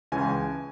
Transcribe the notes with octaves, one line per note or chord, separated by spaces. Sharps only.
C#2 C#3 E3 G#5